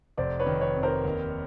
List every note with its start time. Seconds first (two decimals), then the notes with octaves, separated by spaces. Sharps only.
0.17 F1 C5 D5
0.39 B4 C#5
0.46 D#3
0.61 B4 C#5
0.76 F2
0.83 A#4 C5
1.05 D#2